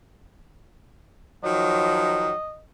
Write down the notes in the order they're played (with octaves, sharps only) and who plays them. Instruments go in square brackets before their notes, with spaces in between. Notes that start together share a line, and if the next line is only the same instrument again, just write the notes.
[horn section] D#3 F3 F#3 [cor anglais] D#5